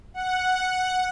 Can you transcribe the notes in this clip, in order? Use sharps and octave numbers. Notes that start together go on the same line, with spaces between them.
F#5